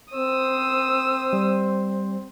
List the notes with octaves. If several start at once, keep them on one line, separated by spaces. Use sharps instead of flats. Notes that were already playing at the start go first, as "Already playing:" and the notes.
C4 C5 D#6 E6
G3